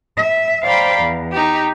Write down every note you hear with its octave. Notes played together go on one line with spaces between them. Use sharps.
E5
C5 D5 F5 G5 A#5 B5
E2
D#4 G4